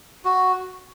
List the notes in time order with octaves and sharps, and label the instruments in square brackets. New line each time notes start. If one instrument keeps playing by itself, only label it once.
[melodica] F#4